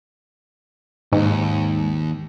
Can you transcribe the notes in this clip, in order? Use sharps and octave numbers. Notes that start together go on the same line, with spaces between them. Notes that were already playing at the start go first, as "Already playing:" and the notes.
D#2 G#2